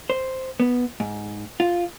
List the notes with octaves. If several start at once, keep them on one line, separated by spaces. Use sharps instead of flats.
C5
B3
G#2
F4